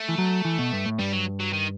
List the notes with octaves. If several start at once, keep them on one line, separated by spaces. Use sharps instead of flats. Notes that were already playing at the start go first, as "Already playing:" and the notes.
Already playing: A3
E3
F#3
E3
B2
G2
A2
G2 G3
F#3
F#3
D#3